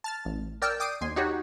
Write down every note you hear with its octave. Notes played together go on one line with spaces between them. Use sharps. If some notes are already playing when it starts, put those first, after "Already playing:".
A5 F6 A6
A1
A#4 D5 G5 A5 E6 F6
G5 D6 D#6 C7 D7 D#7
D#2 G#5 C6
D#4 F#4 G4 C#5